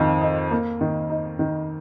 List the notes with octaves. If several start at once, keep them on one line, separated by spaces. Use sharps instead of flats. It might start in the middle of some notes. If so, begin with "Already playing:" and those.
Already playing: F2 D#3 D#4
D#4
A#3
D#3
D#4
D#3